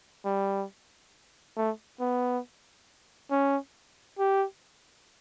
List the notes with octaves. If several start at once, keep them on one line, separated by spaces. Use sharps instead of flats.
G3
A3
B3
C#4
G4